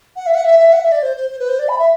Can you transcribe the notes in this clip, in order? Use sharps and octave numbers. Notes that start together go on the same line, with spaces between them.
F#5
E5
F#5
E5
E5
F#5
E5
D5
C5
C5
C5
B4
C5
D5
B5
E5